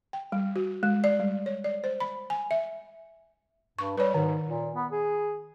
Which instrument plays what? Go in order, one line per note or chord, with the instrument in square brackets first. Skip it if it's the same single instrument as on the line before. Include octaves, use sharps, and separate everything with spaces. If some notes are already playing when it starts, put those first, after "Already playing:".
[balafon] G5
G3
F#4
G#3
D5
G3
C#5
D5
C5
B5
G#5
E5
[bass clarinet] G2 [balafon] C#6
[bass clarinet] G3 [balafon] B4 C#5
[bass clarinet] G#2 [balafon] D#3
[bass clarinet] A#2
B3
G#4